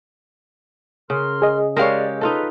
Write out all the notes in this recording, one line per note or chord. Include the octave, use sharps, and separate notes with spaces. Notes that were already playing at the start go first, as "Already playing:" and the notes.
C#3 A#4 C6 F6
G#4 D#5
G#3 G4 A#4 C#5 D5 F5
D#4 F4 A4 B4